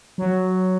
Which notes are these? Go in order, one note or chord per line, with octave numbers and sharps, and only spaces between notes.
F#3